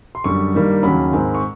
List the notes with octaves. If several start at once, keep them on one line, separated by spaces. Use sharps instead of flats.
C6
F#2 D3 G3 C#6
G2 D#3 G3 A#3
D#2 C#3 F#3 B5
G#2 D#3 G#3 C4
C#6